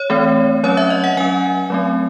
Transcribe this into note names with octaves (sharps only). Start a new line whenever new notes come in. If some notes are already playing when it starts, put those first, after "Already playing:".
Already playing: C#5
E3 A3 C4
F#3 C#4 C#5
E5
D#5
F#5
F#3 C#4 G#5
F#3 A3 C4